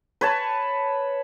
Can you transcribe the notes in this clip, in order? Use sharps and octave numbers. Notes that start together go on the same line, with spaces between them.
B4 C#5 A5